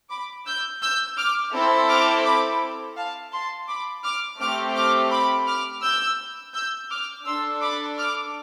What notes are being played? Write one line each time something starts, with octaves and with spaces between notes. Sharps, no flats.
B5 D6
E6 G6
E6 G6
D6 F6
C4 E4 A4
D6 F6
B5 D6
F5 A5
A5 C6
B5 D6
D6 F6
A3 C4 G4 D6 F6
D6 F6
B5 D6
D6 F6
E6 G6
E6 G6
D6 F6
D4 A4 C6 E6
B5 D6
D6 F6